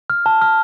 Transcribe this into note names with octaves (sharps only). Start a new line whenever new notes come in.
F6
A5
F6